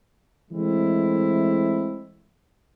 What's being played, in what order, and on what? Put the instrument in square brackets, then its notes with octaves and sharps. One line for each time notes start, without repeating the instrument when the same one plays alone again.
[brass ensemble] E3 G#3 A3 C4 E4